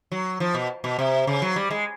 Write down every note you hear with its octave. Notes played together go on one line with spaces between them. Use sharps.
F#3
F3
B2
B2
C3
C#3
F#3
G3
G#3